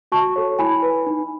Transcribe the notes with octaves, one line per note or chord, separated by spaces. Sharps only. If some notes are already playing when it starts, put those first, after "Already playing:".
F#4 A5 C#6
A4 C#5
E4 G#5 B5
B4
D#4